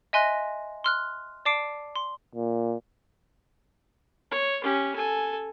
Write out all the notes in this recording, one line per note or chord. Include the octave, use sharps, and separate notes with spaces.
D#5 E5 G#5 C6 F#6 A#6
C6 F6 F#6
D5 A5 D6 C7 D7
C6
A#2
C#5
C#4 G4
A4 G#5